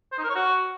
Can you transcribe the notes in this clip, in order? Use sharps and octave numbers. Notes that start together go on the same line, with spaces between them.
C5
D#4
A#4
C#5
F#4